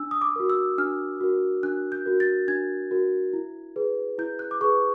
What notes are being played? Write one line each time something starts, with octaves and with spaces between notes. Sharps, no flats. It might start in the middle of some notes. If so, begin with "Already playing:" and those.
Already playing: D4 E6
D#6
D6
F#4 A#4
E6
D4 F6
F#4 A#4
D4 F#6
G6
F#4 A#4
A6
D4 G#6
F#4 A#4
E4
G#4 B4
E4 G6
F#6
D6
G#4 B4 C#6